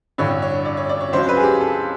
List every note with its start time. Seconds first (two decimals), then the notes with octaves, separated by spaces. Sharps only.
0.18 A1 G2 D3 C#5
0.42 C#5
0.65 D5
0.77 C#5
0.89 D5
1.00 C#5
1.13 C#2 C#3 F#3 C5
1.29 B4
1.37 G#4
1.43 G4
1.60 A4